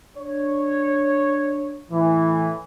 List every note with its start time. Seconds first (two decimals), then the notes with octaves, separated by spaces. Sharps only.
0.17 D4 C#5
1.91 A2 E3